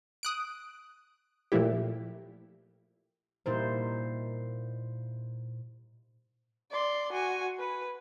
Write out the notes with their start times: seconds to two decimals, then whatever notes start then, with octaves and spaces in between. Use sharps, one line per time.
0.23 D#6 F#6 D7
1.52 A#2 F3 A3 E4 G4
3.46 A#2 G3 A#3 D#4 E4 C5
6.71 D5 C6
7.13 F#4 G#5
7.59 B4